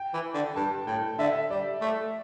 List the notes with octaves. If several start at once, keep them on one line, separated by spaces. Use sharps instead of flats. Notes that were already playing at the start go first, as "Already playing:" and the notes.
Already playing: G5
E3
D3
G2 A5
A2 G5
D3 E5
G3 D5
A3